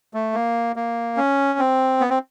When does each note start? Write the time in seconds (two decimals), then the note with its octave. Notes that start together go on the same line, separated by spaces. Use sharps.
0.14 A3
0.34 A#3
0.76 A#3
1.17 C#4
1.59 C4
2.01 B3
2.10 C4